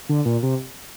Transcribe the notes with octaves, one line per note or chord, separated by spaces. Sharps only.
D3
A#2
C3